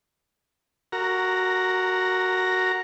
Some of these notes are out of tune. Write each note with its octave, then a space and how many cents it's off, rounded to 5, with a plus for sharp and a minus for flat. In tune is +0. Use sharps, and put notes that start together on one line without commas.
F#4 +0 A#4 -20 A#5 +0